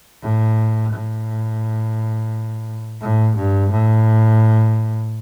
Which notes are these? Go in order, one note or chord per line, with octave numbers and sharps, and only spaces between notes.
A2
A2
A2
G2
A2